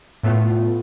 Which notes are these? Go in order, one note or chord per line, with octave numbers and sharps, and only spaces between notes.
A2 A3 B3 F4